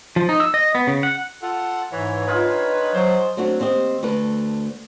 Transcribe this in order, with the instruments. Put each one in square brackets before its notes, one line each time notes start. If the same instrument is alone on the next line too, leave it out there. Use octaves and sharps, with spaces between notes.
[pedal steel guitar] F3
D#4
E6
D#5
B3
C#3
F#5
[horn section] F4 [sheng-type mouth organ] A4 F#5
[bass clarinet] G#2 [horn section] E3 [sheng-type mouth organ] C#5
[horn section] D#3 D4 B4 [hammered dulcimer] D#4 F4 G#4
[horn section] F3 C5 [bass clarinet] F#3
[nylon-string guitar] F#3 A3 C4 D4 F#4
D#2 C4 G4 D#5
D2 A3 B4